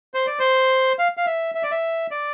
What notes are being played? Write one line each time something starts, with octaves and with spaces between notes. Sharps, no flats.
C5
D5
C5
F5
F5
E5
E5
D5
E5
D5